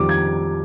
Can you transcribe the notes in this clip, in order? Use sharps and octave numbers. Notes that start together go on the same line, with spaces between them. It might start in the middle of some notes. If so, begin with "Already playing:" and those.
Already playing: F2 D#3 G3 D6
G#6